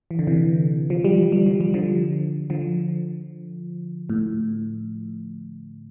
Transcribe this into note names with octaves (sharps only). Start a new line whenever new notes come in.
E3
D3
C3 E3
F3
G3
F3
G3
F3
G3
D3 F3
D3 F3
A2